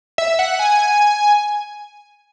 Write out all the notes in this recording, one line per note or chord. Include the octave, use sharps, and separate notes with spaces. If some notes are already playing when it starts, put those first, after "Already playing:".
E5
F#5
G#5